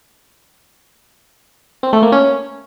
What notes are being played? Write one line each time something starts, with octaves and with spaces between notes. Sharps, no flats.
C4
A3
A#3
C#4